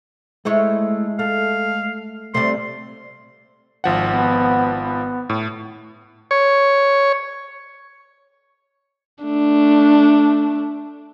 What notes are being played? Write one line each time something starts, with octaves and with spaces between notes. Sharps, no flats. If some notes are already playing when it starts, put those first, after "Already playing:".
G#3 A3 E4 C#5
A3 F5
C3 G3 A3 C6
G#1 F3 F#5
B3
B3
A2
C#5
A3 D4